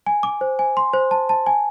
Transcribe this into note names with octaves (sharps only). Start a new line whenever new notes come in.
G#5
D6
C5
G#5
C6
C5
A5
A5
G#5